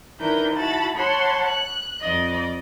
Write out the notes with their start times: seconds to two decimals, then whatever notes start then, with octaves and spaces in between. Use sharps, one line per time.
0.20 D#3 D4 E4 A#4 B4 G6
0.56 E4 F#4 A5 B5 A6
0.97 C#5 F#5 A5 B5 C6
1.48 F#6
2.01 F2 D5 D#5